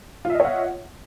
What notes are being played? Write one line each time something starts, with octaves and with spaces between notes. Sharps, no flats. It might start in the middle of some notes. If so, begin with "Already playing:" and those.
F4 C#5 D#5 E5 F#5